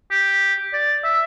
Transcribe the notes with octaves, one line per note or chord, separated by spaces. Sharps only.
G4
D5
E5